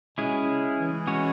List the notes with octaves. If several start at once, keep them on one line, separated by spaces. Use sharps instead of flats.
B2 G#3 C#4 E4 G#4
C#3
E3
G#3 C#4 F#4 C#5